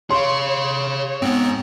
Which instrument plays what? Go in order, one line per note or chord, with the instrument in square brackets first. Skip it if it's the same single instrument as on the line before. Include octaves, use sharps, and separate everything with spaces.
[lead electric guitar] G#4 F5 [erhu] C#5 [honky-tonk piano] C6
[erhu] C#5
[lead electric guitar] G#2 [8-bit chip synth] B3 C4